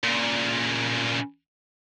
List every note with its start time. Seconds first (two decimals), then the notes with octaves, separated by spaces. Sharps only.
0.04 A#2 C#3